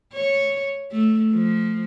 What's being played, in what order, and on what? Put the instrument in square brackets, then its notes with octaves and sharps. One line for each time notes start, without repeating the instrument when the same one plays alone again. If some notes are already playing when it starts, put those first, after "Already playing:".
[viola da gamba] C#5
A3
F3